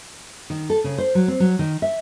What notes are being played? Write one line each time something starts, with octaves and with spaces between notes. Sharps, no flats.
D#3
A4
C#3
C5
F#3
C4
F#3
D#3
E5